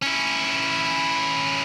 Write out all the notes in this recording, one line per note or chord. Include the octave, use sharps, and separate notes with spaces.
C#4 E4